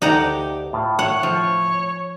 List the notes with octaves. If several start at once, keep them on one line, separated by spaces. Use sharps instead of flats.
D2 D#4 G4 A4 F#5 A#5
A2 F4
C#5 F#5
F3